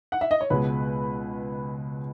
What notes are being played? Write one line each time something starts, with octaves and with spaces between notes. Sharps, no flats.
F#5
E5
D#5
C#5
C#2 B2 G#3 B4